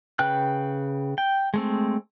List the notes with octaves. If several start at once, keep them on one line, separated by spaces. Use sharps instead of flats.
C#3 B4 G5 F#6
G5
G#3 A3 C4